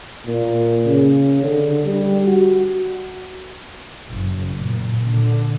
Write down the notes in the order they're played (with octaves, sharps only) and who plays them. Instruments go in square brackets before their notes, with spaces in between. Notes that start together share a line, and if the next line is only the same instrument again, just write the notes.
[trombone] A#2
C#3
D3
G3
F#4
[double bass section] F#1
A#2
D3